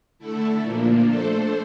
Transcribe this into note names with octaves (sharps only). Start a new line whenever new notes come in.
D3 A3 E4 A4
A#2 F3 A#3 D4
A3 D4 A4 C5